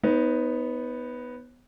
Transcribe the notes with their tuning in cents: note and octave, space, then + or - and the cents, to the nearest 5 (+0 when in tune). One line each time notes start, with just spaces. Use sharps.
B3 +0 D#4 +15 C#5 -45